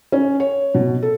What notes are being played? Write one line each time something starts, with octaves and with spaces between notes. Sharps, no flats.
C#4
C#5
B2
A4